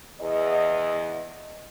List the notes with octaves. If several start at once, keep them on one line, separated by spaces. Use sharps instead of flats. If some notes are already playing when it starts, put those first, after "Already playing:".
E2 D#5